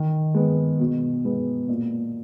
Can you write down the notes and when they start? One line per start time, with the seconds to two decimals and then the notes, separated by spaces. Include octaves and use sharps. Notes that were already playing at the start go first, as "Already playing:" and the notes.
Already playing: D#3
0.34 G#3 B3
0.80 B2
1.25 G#3 B3
1.68 A#2